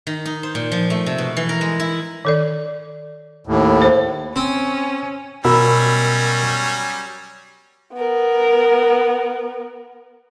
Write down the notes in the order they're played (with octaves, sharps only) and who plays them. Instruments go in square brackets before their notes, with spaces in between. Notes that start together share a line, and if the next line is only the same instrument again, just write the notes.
[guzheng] D#3
D#4
C5
A#2
F3
A3
C3
B2
E3
A#4
G#3
E4
[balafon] D#3 A4 D5
[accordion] D#2 A2
[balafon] C5
[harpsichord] C4 [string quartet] C#4
[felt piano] B2 [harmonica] F#3 G3 C#4 [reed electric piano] A#4 B5 E6
[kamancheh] B3 A#4